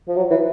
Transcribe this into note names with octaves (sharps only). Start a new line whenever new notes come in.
F3
F#3
E3